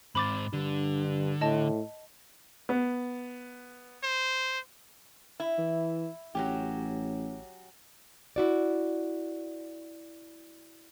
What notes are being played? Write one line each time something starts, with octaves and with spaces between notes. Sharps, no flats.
G#2 C4 B5 D6 A6
G2 D3
A2 D#5 A5
B3
C5
E4
E3
A1 F#3 C#4 G4
E4 F#4 D5